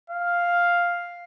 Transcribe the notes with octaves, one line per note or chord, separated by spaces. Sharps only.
F5